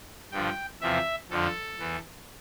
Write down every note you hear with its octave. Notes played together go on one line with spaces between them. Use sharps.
G2 D3 F3 G5
E2 C3 F3 E5
F2 D3 F3 A4
E2 E3